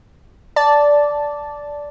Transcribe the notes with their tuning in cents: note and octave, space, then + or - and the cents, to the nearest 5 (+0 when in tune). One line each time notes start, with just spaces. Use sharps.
D5 -10 A5 +0